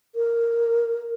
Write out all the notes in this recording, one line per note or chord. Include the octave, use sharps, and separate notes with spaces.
A#4